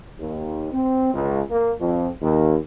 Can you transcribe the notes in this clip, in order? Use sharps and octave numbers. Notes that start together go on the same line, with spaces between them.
D#2
C4
C#2
A#3
F2
D#2